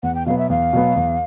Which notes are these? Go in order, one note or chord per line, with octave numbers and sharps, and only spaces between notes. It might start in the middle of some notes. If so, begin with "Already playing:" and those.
E2 F#5
G5
B2 F#3 B3 F5
E5
E2 F5
B2 F#3 B3
E2